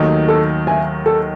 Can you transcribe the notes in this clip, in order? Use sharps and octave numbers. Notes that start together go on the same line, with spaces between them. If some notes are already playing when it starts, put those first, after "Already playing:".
Already playing: D#2 D#3 F#3 A3 D#4
A4
E5 G#5
A4